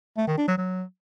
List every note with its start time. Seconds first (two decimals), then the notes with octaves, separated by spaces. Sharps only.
0.17 A3
0.28 D#3
0.38 D4
0.48 F#3
0.58 F#3